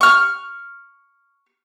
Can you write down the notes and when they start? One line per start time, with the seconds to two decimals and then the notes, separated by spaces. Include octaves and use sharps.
0.01 C#6 F6